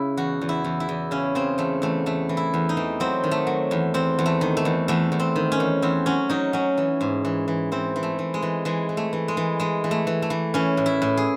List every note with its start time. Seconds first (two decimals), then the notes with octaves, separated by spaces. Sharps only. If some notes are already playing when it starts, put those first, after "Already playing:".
Already playing: C#3 E4
0.17 E2 F#4
0.41 E2
0.49 E4
0.64 E2
0.80 E4
0.89 E2
1.11 C#3 C#4
1.35 C#3 C4
1.58 E2 A3
1.82 E2 A3
2.06 E2 A3
2.29 E3
2.37 E4
2.54 E2
2.69 D#4
2.77 E3
3.00 F#3 C4
3.24 D#3
3.31 A3
3.47 F#3
3.71 E2
3.94 E2 C4
4.19 E2
4.26 A3
4.41 D#3
4.57 A3
4.65 E2
4.88 E2 A3
5.12 E2
5.20 C4
5.36 D#3
5.52 C#4
5.60 E2
5.82 E2 C4
6.06 F#3 C#4
6.30 F#3 D#4
6.53 F#3 C#4
6.77 E3
7.01 G#2
7.25 E3
7.48 E3
7.72 E3 C4
7.96 E3
8.03 A3
8.19 E3
8.34 G#3
8.42 E3
8.65 E3 G#3
8.89 E3
8.97 A3
9.13 E3
9.28 G#3
9.37 E3
9.60 E3 G#3
9.84 E3
9.91 A3
10.07 E3
10.22 A3
10.30 E3
10.54 E3 C#4
10.77 A2
10.86 E4
11.02 A2
11.17 G#4